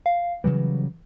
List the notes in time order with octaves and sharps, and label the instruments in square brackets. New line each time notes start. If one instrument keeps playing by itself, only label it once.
[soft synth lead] F5
[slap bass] C#3 F#3 G3 [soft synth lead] E3